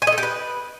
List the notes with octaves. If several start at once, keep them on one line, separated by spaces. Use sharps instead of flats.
G#5
D#5
A4
G4
B4